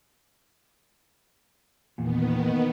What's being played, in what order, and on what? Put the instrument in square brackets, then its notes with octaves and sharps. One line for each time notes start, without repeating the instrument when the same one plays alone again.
[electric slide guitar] E2 A#2 [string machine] D#3 B3